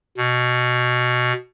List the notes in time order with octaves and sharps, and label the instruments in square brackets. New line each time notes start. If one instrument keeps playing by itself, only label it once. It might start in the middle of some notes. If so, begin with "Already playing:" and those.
[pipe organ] B2